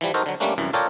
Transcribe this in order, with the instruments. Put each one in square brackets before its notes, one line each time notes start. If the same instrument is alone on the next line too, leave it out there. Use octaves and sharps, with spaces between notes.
[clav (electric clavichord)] E3 F3 G3
D#4 F#4 A4 A#4 C5
D3 F#3
G3 A3 A#3 C#4 D4
C2 F#2 E3
F4 A4 A#4 C#5 D5 G5